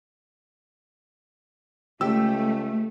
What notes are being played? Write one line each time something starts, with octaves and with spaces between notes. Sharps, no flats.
C#2 A3 G4 E6